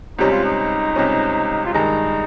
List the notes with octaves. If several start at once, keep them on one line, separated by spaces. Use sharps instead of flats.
C#2 C3 G3 C#4 D#4
F4
D#4
C#2 C3 G3 C#4
F4
G2 D#3 G#3 D#4